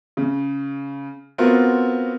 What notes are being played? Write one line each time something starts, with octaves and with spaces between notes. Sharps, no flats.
C#3
B3 C4 F4 F#4 A#4